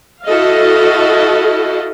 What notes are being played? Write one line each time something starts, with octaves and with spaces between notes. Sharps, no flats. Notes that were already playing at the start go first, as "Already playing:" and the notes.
E4 F#4 A4 D#5 F5